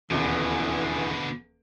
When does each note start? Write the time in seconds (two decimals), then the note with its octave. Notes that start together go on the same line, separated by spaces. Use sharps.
0.11 D#1 E2 B2 D3 E3